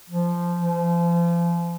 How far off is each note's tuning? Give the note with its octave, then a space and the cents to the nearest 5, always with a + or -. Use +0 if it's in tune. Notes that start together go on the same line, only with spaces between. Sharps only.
F3 -10
F3 -35